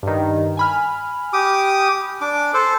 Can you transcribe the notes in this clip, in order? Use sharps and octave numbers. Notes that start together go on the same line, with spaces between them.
G2 D#3
G#5 B5 F6
G4 D6 D#6
D4 D6
A4 C5